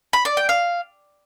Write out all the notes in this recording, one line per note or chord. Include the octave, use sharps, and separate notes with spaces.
B5
D5
G5
F5